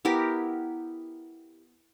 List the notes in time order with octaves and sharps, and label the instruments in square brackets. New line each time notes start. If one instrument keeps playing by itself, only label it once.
[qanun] B3 E4 G4 A#4